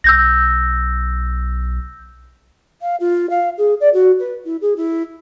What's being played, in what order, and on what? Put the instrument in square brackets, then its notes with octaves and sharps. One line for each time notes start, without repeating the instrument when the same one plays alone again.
[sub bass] B1 [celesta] E6 G6 A#6
[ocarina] F5
F4
F5
G#4
D5
F#4
B4
E4
G#4
E4